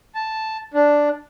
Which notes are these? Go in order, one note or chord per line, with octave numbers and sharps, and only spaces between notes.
A5
D4